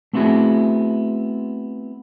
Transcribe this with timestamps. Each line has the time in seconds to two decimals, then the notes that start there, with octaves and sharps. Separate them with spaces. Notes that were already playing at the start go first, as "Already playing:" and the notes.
0.13 A3 B3 C4 E4 F#4 G#4